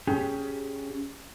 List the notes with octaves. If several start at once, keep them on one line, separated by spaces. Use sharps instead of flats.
C#4 G4 G#4 G5